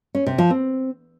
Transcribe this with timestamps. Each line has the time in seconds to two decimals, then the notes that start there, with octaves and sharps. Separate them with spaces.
0.15 C#4
0.26 C3
0.38 F3
0.50 C4